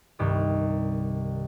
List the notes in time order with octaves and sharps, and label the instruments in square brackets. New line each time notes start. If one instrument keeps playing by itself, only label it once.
[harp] C2 G2 D#3